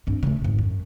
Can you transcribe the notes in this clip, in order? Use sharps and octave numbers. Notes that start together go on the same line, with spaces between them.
G2 C4
C#3 A3
G#1 F#2
F#2